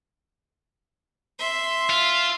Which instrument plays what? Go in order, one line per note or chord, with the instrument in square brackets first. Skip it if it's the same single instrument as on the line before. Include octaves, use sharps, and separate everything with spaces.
[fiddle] E5 C6
[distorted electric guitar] F4